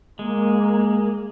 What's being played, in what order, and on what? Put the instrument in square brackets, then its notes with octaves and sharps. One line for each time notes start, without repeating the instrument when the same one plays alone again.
[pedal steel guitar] G#3 [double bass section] A#3